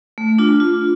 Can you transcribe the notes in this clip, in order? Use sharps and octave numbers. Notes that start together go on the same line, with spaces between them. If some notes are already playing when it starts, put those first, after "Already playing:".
A3
D4 F4
F4